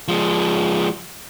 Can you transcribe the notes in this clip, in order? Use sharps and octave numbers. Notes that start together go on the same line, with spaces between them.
F3 G#3